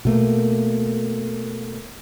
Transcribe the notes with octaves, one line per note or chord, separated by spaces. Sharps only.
B2 A3 A#3